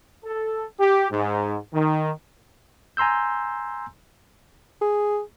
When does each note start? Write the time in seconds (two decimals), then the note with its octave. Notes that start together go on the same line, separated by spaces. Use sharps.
0.24 A4
0.79 G4
1.11 G#2
1.74 D#3
2.97 G#5 A#5 C6 E6 G6
4.81 G#4